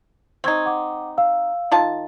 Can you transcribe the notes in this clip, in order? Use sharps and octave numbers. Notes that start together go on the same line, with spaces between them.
C4 D#4 C6 C#6 G#6
F#5 D6
F5 E6
D#3 F4 A5